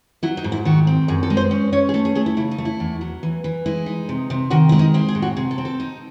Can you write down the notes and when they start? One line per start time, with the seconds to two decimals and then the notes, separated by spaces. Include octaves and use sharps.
0.23 F#3 E4
0.37 D#4
0.44 G#2
0.52 E4
0.65 D#3 F#4
0.87 C4
1.08 F#2 G#4
1.23 A4
1.30 G#3
1.37 C5
1.51 C#4
1.72 C#4 C#5
1.89 G#4
1.94 A3 A4
2.05 G#4
2.15 A3 G#4
2.26 E4
2.37 C#3 E4
2.51 D#4
2.58 A3
2.65 E4
2.80 E2
3.01 F#3
3.23 E3
3.44 E3
3.66 G#3 E4
3.86 D#4
4.09 C3
4.30 C3
4.50 D#3 F#4
4.69 G#3 E4
4.79 D#4
4.94 C4 E4
5.09 G#4
5.15 A2
5.22 F#4
5.37 C3 G#4
5.51 A4
5.58 C4
5.65 A4
5.80 D#4